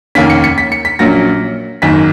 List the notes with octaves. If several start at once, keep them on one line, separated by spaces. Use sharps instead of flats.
F1 D#2 D#3 A#3 C#4 B6
C#7
C#7
B6
C#7
B6
A#1 A#2 F#3 A#3 C#4 A#6
G#1 F#2 D#3 A#3 B6